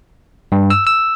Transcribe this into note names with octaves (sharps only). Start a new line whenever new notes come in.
G2
E6
E6